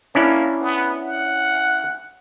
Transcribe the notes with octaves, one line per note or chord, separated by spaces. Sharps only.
A#3 C#4 D4 E4
B3
F#5